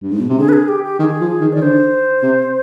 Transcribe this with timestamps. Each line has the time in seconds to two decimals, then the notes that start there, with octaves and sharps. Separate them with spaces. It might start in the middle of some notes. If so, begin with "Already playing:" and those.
0.02 G2
0.11 G#2
0.20 B2
0.30 C3
0.38 D3 G#4
0.49 B4
0.53 G#4
0.68 G4
0.84 G4
0.99 D#3 G#4
1.21 F3
1.41 D#3
1.53 D#3 D5
1.62 D3 C5
2.23 C3